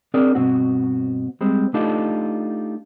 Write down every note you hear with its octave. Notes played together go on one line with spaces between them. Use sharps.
C4 D4 G#4 A#4 D5
G2 B2 C4 F#4
G3 G#3 C4
A3 D4 D#4 F4 G4 A4